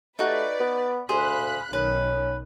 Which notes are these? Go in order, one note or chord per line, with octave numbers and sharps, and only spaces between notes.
A3 D#4 F#4 B4 D5
B3
D2 G#4 C5 F5 B5 F#6
B1 D#3 C#4 B4